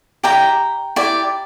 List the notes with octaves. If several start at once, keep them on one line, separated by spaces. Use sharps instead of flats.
E4 G4 D5 G5 A#5
E4 G4 D5